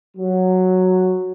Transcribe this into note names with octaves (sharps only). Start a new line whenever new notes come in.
F#3